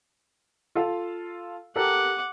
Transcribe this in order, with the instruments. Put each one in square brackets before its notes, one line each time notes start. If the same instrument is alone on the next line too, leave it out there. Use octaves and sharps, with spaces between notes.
[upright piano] F4 A4 F5
[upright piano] G4 A4 A#4 [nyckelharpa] F#5 D6